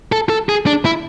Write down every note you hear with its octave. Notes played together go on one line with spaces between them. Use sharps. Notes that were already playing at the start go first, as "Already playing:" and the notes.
A4
A4
G#4
D4
E4